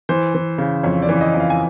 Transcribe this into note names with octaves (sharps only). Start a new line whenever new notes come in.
E3 C5
E3
C#3
F2 C#5
D5
E3
D#5
F2
F5
G#5